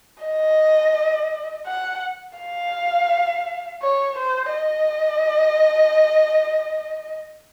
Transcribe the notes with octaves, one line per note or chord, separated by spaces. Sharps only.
D#5
F#5
F5
C#5
C5
D#5